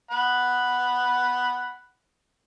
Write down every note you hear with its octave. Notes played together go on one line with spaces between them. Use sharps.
F#5 B5